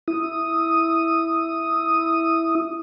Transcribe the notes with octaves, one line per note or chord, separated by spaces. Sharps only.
E4 D#6